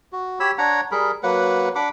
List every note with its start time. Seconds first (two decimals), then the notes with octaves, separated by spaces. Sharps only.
0.12 F#4
0.40 G4 C#5 B5 E6
0.58 D4 C#5 F#5 A#5
0.91 G3 G#4 A#4 B5
1.23 F#3 A#3 B4 F#5
1.75 D4 F#5 B5 D6